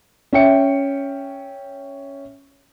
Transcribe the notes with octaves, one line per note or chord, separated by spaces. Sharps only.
C#4 E5 G5 C#7